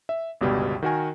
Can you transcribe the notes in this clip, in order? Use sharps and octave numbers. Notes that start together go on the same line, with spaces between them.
E5
G1 C#2 B2 G3
D#3 F#4 A#4 G#5